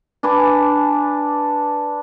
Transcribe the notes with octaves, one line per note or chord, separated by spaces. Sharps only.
D4 B4 G#5 D6